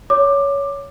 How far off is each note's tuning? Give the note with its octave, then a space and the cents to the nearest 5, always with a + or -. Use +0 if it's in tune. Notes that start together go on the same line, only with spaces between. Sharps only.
C#5 +15 D6 +15